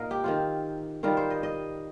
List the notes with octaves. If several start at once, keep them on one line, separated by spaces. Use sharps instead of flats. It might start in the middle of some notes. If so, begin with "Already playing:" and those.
Already playing: A#2 D#4 A#4 D#5 F5
G4
D#3 C4 F4
D#3 G3 C4 F4 A#4
C5
D#5
D#5